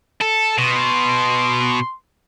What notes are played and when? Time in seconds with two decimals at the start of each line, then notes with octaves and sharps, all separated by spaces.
0.21 A4
0.58 B2 C6